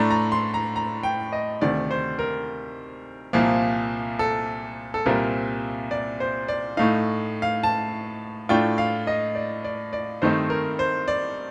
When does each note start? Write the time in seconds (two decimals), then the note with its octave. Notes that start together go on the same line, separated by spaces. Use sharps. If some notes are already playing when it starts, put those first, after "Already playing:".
Already playing: A2 A3 D4 A#5
0.10 A#5
0.32 C6
0.54 A#5
0.76 A#5
1.03 G5
1.32 D#5
1.61 D2 C3 D#3 A3 D5
1.91 C5
2.19 A#4
3.33 C2 A#2 F3 A#3
4.19 A4
4.94 A4
5.06 C2 A#2 G3 C4 F4 A#4
5.91 D5
6.20 C5
6.48 D5
6.77 A2 A3 D#4 F5
7.42 F5
7.63 A5
8.49 A2 A3 D4 F4 G5
8.78 F5
9.07 D#5
9.35 D5
9.64 D5
9.93 D5
10.22 G2 D#3 A3 C4 D#4 C5
10.50 A#4
10.79 C5
11.08 D5